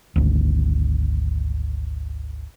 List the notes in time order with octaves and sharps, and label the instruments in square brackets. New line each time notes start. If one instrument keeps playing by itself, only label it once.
[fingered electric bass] G#1 D2